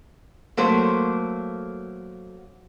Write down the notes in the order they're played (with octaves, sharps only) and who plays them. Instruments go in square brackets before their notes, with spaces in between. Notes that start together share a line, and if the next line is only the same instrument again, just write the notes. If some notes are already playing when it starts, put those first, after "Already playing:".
[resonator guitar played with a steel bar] F#3 A3 A#3 C5